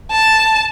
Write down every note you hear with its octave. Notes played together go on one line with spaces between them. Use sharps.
A5